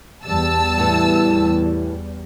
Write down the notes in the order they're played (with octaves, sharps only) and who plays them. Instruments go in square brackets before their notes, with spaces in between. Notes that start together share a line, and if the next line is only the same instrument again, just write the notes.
[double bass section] E2 G3 [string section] A5 E6
[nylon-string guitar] A2 E3